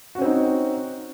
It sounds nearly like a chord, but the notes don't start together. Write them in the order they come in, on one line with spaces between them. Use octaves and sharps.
F#4 C#4 C4 D#4